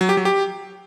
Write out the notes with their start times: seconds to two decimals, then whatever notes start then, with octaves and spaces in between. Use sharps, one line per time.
0.01 F#3
0.09 G4
0.17 F#3
0.25 G4